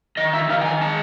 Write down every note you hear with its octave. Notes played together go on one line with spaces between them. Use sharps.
D#3 D#5
E5
D#3 F5
G5
G#5
G#3 A5